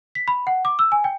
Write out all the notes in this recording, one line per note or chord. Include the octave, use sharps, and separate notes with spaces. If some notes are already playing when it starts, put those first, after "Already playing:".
B6
B5
F#5
D6
E6
G#5
G5